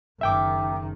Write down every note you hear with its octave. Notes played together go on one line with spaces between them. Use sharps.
F#1 D#3 E5 G5 D6